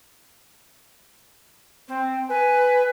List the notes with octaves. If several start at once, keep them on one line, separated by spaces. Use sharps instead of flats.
C4
B4 G#5